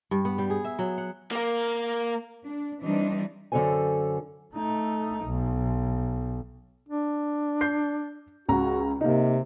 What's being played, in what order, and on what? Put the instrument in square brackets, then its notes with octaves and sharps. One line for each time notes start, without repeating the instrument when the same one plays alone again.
[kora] G2
B3
G3
G#4
E5
F#3
F#5
[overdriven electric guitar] A#3 A#4
[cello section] D4
E3 G3 C4 D4 D#4
[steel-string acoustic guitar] F#2 D3 D#3 A4 C5 G#5
[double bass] A3 D#4
B1
[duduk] D4
[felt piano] G6 C7
[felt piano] C#2 G#4 A#5 [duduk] F#4
[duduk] C3 [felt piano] A#3 D#4